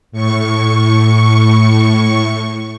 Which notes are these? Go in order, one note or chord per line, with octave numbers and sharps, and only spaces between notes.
A2 C#6